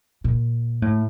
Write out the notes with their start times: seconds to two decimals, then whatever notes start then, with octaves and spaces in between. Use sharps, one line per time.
0.24 A#2
0.82 A2